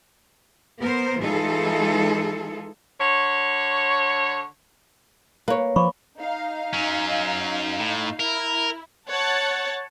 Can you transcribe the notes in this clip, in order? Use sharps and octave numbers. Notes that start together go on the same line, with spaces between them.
B3 A#4 C5
E3 G#3 D#4 F4 G#4 A4
D3 C#5
A#3 B4 C#5
F3 B5 C#6 D6
D#4 F5
F#3 C#4
A2
E4 A#4
C#5 F#5 A5 F#6 A6